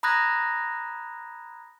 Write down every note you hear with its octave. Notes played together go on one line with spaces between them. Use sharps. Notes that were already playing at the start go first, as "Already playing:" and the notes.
A#5 B5 D#6 F#6 G#6 A#6